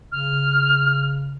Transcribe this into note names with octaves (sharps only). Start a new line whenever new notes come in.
C#3 F6